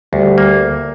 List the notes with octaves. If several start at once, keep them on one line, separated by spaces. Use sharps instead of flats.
D2 G3
A#3